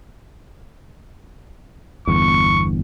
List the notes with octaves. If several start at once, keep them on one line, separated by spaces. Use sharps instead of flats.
G1 E2 C#6